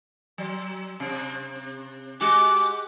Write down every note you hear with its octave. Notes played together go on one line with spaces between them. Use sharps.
F#3
C3
G#3 F#4 G4 D6